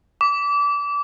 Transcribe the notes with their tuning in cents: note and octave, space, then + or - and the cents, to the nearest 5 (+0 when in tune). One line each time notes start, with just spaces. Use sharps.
D6 -25